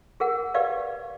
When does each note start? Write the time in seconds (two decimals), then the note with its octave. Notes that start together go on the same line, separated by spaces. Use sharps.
0.20 G#4 A#4 F#5
0.54 G4 B4 D5 F5